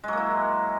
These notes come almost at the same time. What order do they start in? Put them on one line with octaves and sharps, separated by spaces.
G#3 F#3 A#3 E4